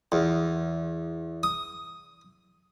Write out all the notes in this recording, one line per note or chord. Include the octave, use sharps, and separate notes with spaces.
E2
D#6